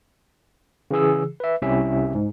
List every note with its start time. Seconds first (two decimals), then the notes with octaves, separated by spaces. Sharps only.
0.91 C#3 E3 G#4 E6
1.40 B4 E5
1.62 C2 C3 C#4 E4 E5
2.14 G#2